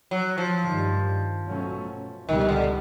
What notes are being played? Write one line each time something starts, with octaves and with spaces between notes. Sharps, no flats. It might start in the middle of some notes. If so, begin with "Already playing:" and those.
F#3
F3
G2 D#3 G3
B2 F#3 A3 C#4
C#2 B2 D#3 G3
D3